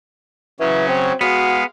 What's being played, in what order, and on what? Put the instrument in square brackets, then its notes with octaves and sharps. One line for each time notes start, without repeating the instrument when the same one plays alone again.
[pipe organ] C#3 F#3 C#4 [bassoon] E3
[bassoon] C4
[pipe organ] G#3 F5 [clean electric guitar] B3 [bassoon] F#4